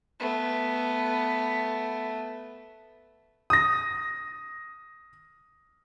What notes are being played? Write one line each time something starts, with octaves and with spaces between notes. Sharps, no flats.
A3 B3
D#6 A#6